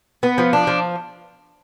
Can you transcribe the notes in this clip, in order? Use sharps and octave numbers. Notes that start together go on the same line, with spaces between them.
B3
F3
D4
F3